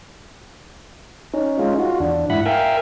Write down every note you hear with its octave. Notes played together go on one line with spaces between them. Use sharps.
C#4 D#4
G#3 C#4 D#4 F4
F4 F#4
E2 D4
G#2 E4 F#5 B5
A#4 E5 F5 G5 G#5